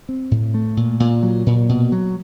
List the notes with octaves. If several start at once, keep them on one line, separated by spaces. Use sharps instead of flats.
C4
A2
A3
A#2
A#2
F#3
A#2
B2
F#3